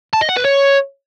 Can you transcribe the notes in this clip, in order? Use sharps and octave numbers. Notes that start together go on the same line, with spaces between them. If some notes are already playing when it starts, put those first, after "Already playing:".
A5
D#5
F#5
B4
C#5